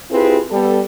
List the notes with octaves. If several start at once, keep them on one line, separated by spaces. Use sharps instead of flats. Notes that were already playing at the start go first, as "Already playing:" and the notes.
C4 E4 F4 G4 G#4 B4
G3 B3 A4